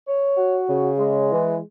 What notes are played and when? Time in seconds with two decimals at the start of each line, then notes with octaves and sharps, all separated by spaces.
0.07 C#5
0.38 F#4
0.69 C#3
0.98 G#3
1.31 E3